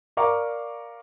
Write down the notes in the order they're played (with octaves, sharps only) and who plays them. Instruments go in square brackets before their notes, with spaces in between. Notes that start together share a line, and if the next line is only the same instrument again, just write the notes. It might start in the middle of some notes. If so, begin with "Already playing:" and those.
[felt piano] A#4 D5 F5 A#5 C#6 D6